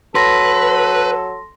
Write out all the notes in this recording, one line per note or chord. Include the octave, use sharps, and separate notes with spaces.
F#3 A4 B4 C6 A#6